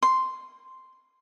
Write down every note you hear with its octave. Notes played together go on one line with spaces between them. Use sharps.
C6